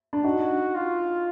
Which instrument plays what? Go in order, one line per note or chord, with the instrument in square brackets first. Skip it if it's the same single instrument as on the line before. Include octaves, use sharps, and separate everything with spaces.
[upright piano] D4
[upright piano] D#4 [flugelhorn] F#4
[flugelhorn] F4